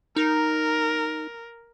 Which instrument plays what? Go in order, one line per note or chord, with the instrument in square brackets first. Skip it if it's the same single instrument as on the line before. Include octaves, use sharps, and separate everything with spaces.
[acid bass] D#4 [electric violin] A#4